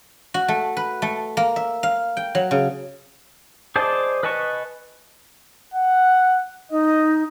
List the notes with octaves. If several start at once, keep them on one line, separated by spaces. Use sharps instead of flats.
F#4
A3
B4
A3
A#3
E5
F5
G5
F#3
C#3
G#4 C5 D5 D#5 A5
B4 D#5 G#5 A5 C#6
F#5
D#4 D#5